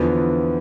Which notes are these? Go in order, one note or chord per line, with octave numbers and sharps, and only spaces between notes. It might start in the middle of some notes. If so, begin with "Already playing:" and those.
Already playing: E2 D3 F3 B3